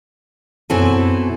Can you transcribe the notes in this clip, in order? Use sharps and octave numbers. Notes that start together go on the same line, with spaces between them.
F#2 B2 C4 E4 A4 G#5